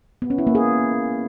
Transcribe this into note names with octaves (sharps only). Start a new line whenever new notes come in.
B3
C#4
E4
A#3
G#4